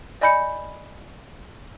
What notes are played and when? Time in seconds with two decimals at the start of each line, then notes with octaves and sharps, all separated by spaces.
0.21 D5 D#5 G#5 B5 G6 C#7